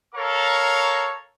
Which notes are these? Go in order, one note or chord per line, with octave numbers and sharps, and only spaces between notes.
A4 A#4 C#5 F5 A#5 C#6